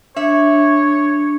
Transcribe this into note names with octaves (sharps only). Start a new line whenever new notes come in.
D4 C#5 E5